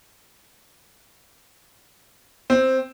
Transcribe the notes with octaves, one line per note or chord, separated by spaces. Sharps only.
C4